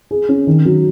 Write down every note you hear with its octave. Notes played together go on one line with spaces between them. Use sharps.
G#4
C#4
D#3
F#3